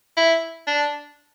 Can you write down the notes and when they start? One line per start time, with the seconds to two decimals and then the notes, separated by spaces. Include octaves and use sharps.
0.17 E4
0.67 D4